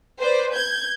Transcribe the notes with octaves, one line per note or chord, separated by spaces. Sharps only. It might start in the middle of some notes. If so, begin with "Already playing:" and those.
B4 C5 D5
G6 G#6